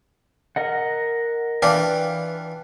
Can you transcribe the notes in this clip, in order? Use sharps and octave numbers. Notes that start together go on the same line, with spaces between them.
A#4 D#5 F#5
E3 D4 F4 B4 D5 G5 D6